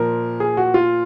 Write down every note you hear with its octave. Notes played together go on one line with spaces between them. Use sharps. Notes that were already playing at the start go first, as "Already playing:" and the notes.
Already playing: A#2 F3 A#4
G#4
F#4
F4